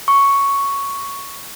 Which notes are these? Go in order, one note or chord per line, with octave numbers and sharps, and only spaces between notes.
C#6